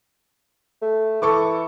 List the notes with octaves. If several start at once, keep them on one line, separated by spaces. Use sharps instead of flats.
A3
E3 A4 C#6 D6